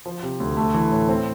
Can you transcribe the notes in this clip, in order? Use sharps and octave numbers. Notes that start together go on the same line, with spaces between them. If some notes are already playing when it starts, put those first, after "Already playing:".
F3
C3
D2
A3
E3
A2
C4